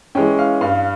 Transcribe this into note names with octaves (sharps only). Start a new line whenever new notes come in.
E3 G#3 C#4 G5
F5
G2 F5